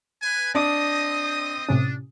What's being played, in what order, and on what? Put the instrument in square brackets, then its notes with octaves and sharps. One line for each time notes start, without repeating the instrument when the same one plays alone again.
[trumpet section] B4 G#5
[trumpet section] C4 D#5 [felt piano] D4 [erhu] D#6
[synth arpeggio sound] A2 C3 C#4 [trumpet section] D4